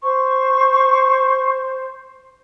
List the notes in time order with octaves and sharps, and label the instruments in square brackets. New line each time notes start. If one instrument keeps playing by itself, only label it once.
[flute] C5 [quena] C#6